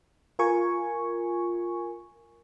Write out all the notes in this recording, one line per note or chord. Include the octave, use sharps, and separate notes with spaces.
F4 A#4 G#5 C#6